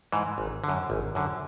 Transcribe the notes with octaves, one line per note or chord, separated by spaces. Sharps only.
G#2 E3
G#1
F#2 D3
G#1
F#2 D3